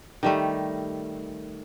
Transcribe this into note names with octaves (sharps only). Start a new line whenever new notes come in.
D#3 G3 A3